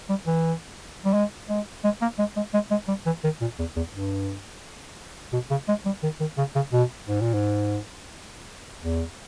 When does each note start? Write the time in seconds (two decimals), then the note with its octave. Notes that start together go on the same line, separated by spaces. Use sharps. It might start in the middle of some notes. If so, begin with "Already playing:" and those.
0.09 G3
0.27 E3
1.05 G3
1.13 G#3
1.49 G#3
1.84 G#3
2.01 A#3
2.19 G#3
2.36 G#3
2.54 G#3
2.71 G#3
2.88 G3
3.06 E3
3.24 D#3
3.41 A#2
3.59 E2
3.76 E2
3.93 G2
5.33 B2
5.51 C#3
5.68 G#3
5.86 G3
6.03 D#3
6.20 D#3
6.38 C#3
6.55 C#3
6.72 B2
7.07 G#2
7.21 A#2
7.34 G#2
8.81 E2